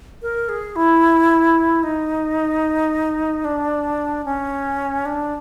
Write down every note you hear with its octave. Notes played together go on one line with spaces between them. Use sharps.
A#4
G#4
E4
D#4
D4
C#4
D4